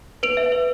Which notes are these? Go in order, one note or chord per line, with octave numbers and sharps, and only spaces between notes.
B4 D7 F7
E5
B4